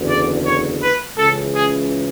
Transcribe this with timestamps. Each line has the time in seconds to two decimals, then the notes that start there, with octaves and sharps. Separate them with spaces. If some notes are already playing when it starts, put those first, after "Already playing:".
Already playing: F#1 E2 D3
0.08 D5
0.45 C#5
0.81 B4
1.18 C#2 C#3 E3 A4
1.53 G#4